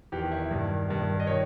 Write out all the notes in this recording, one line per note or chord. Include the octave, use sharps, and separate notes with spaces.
E2 D#3 G4
E4
G2 D#3
G2 D#3
D#5
D#3 C#5